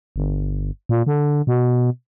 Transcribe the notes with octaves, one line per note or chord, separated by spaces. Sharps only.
G1
A#2
D3
B2